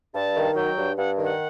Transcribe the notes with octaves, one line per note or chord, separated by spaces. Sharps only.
G2 A5
D#3
F#3 G5
G2
G2 F#5
D#3
F#5